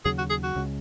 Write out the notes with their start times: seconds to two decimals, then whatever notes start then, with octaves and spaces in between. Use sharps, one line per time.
0.05 D#2 C#3 F#3 G#4
0.18 F#4
0.30 G#4
0.43 F#4
0.55 C#2 C#3 G#3